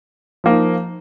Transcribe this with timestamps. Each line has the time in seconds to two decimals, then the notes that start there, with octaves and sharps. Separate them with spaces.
0.44 F3 A#3 D#4